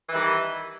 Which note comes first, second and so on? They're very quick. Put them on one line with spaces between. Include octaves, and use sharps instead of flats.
E3 D#3 G3